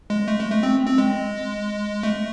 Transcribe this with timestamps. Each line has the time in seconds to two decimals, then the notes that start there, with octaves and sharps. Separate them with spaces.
0.10 G#3
0.28 A3
0.39 G#3
0.52 A3
0.63 C4
0.87 C4
0.98 G#3
2.03 A3